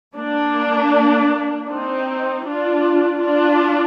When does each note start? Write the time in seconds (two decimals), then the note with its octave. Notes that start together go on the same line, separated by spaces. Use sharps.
0.16 A#3 D4
1.69 C4 D#4
2.46 D4 F4
3.21 D4 F4